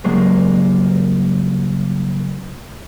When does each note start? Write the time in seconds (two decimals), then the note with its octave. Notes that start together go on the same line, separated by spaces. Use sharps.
0.04 C#2 G2 F#3 G#3 A#3